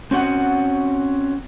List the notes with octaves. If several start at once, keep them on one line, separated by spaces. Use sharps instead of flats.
C4 C#4 F#4 F#5